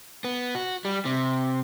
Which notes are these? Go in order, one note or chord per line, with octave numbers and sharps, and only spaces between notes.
B3
F#4
G3
C3